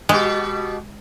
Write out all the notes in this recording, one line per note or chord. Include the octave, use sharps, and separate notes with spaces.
B2 G#3 F#4 G4